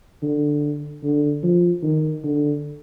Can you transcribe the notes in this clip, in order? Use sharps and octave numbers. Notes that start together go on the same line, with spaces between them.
D3
D3
F3
D#3
D3